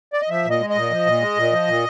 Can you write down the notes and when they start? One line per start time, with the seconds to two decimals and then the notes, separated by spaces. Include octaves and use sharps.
0.13 D5
0.21 D#5
0.29 F3 E5
0.45 A#2
0.50 D#5
0.60 G#3
0.70 D#5
0.75 A#2
0.91 F3
1.06 A#2
1.21 G#3
1.37 A#2
1.52 F3
1.68 A#2